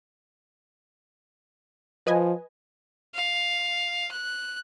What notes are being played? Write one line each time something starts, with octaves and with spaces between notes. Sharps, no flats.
F3 B4 D#5 G#5
F5
F#6